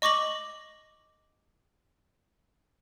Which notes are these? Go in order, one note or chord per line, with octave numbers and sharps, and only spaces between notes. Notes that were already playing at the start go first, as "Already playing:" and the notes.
D#5 C#6 D6 A#6 F#7